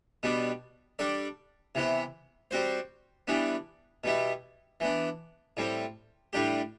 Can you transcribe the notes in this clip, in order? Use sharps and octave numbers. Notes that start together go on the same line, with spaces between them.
B2 G3 B3 D4
G3 D4 A4 D5
C3 E3 B3 E4
G3 C4 F#4 C5
E3 G3 B3 D4
B2 G3 B3 E4
E3 B3 D4
A2 G3 C4
A2 G3 D4 G4